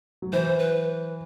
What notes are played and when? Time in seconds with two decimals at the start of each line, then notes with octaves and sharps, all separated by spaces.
0.22 F#3
0.33 E3 C5
0.59 B4